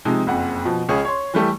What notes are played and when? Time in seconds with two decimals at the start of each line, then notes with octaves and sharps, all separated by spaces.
0.05 C3 F3 G#3 D#4
0.27 F#1 F2 F#5
0.65 B2 F3
0.89 C#2 C#3 C#4 G#4 C#6
1.05 C#5 C6
1.34 E3 G3 A3 G4